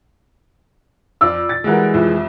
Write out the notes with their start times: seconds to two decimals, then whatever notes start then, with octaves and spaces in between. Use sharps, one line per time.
1.21 F2 F4 D5 E6
1.49 A6
1.64 E3 G3 G#3 F#4 A#4
1.94 C2 F2